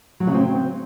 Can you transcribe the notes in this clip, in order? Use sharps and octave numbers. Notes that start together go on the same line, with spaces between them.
F#3
C#3
C4